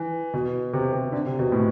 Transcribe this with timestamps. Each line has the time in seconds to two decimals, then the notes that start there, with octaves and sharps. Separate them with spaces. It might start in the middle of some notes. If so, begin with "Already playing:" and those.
Already playing: E3
0.34 B2
0.73 C3
0.92 C3
1.12 D3
1.26 C3
1.39 B2
1.52 A2